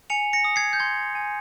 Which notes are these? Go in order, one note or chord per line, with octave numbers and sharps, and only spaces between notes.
G#5 C#7 F7
A#6 C#7
D#6
G#6 C7
G6
C6 G#6
G#5